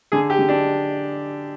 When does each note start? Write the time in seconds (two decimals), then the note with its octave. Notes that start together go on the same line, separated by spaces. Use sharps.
0.12 D3 G#4
0.30 G4
0.39 D3
0.49 D4